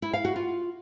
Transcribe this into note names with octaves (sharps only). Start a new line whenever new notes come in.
E4
F5
F#4
F4